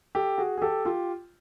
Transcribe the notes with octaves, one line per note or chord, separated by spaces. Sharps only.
G4 A4
F#4 G#4
G#4
G4 A4
F4 G4